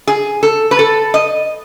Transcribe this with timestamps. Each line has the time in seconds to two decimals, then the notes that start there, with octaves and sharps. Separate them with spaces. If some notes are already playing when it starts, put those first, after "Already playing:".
0.07 G#4
0.43 A4
0.71 B4
0.79 A4
1.14 D#5